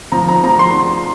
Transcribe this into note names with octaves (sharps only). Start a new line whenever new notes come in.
F3 A#5
A#5
F3 A#5
C6